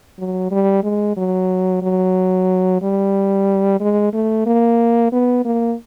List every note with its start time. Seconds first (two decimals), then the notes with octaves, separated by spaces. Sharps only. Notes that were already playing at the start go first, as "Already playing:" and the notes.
0.19 F#3
0.51 G3
0.83 G#3
1.17 F#3
1.82 F#3
2.82 G3
3.80 G#3
4.13 A3
4.46 A#3
5.12 B3
5.45 A#3